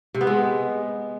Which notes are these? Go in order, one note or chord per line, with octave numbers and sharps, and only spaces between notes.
C3
B3
G#3